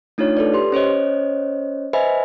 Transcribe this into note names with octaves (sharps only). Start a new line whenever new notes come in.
A3 D4 D#4 F4 C#5
A4 B4 D5
G4 B4 C6
C#4 C5 C#5 D#5
B4 C5 D#5 E5 G#5 B5